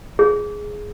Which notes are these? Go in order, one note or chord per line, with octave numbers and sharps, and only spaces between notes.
G#4